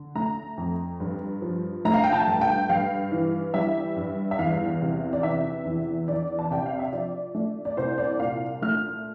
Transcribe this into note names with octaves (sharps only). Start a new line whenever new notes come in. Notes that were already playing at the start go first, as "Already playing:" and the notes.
Already playing: D3
A3 A#5
F2
G2
F3
A3 A#5
F5
G5
A5
G2
G5
G2 F5
E3
G3 E5
G2
E5
E2 F5
C3
D5
E3 E5
E2
E2 D5
A5
C3 G5
F5
E5
F3 D5
A3
D5
C2 C5
D5
A#2 F5
A3 F6